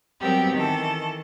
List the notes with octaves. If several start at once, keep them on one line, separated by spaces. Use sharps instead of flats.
F#3 G3 B3 C4 G4 A#4
D#3 E3 A4